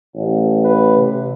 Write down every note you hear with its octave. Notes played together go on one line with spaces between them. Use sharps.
A1
B4
C3